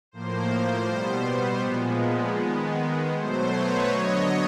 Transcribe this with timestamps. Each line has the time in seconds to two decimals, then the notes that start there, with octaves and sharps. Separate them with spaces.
0.12 A2 F3 A#3 C5
0.87 B2 G3 B3
1.62 A#2 F3 G#3 B3
2.38 D#3 G#3 B3
3.12 B2 F#3 A3 C5
3.50 B4 C#5
3.88 D3 F#3 B3 C#5 D#5